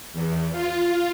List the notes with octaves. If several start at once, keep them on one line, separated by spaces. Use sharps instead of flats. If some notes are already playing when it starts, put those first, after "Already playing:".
E2
F4